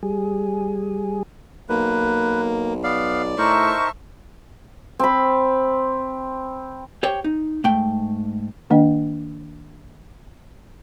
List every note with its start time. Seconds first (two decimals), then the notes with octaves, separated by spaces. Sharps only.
0.03 G3 G#4
1.69 B1 A#3 B4
2.83 B3 D5 F5
3.38 A2 D#4 A#4 C5 E5 A5 C#6
4.99 C4 B5
7.03 G4 C5 C#5 G5
7.24 D#4
7.64 G#2 A3 G5
8.70 D#3 A#3 D4 D#5 G5